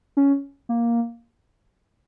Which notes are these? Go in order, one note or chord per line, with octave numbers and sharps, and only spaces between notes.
C#4
A#3